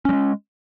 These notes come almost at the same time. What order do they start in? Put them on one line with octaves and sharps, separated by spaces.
C#4 G3 G#3